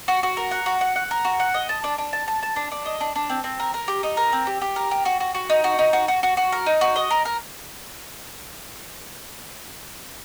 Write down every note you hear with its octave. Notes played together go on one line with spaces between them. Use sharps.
F#4
F#4
A#4
F#5
F#4
F#5
F#5
A#4
F#4
F#5
D#5
A5
D4
D4
A5
A5
A5
D4
D4
D#5
D4
D4
C4
C4
A#4
A#4
G4
D#4
A#4
C4
G4
G4
A#4
G4
F#4
F#4
F#4
D#4
F#4
D#4
F#4
F#4
F#4
F#4
A#4
D#4
F#4
D#5
A#4
A#4